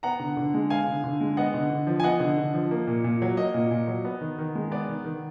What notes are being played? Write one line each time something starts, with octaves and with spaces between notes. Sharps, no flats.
B3 F#5 A#5
D3
D3
G#3
B3 F5 G#5
D3
D3
G#3
B3 D#5 F#5
D3
D3
F3
G#5
B3 D#5 F#5
D3
D3
F3
A#3
A#2
A#2
F#3
A#3 D#5
A#2
A#2
F#3
B3
D#3
D#3
G#3
B3 D5
D#3
D#3